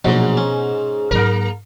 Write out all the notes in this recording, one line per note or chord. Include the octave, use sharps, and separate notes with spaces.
A#1 G#2 B2 F#3
C#4
G#2 F#3 A#3 A#4